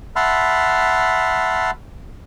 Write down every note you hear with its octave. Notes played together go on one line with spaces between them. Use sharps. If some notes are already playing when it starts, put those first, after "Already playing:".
E5 F#5 A5 B5 C6 F6